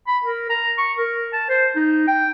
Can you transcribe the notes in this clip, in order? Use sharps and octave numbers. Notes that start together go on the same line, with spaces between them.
B5
A#4
A#5
C#6
A#4
A5
C5
D#4
G5